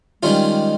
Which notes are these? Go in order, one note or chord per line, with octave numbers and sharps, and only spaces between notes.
D#3 G3 G#3 C#4 F4